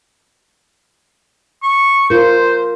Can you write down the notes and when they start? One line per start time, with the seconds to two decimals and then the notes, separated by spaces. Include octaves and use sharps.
1.63 C#6
2.10 F4 A#4 C5